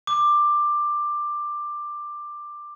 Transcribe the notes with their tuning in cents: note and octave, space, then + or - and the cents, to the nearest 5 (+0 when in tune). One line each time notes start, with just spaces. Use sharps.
D6 +15